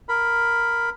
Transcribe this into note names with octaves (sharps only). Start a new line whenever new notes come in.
A#4 B5